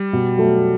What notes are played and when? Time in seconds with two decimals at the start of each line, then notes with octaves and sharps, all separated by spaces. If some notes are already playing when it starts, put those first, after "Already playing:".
Already playing: G3
0.13 B2
0.38 F#3 A3